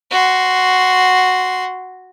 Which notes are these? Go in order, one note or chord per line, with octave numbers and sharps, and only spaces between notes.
F#4 C6